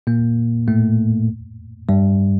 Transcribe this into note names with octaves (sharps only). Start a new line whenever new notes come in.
A#2 A#3
A2 A3
G2 G3